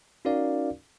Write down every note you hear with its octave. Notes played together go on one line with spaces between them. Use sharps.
C#4 D#4 F#4 A#4 D5 F5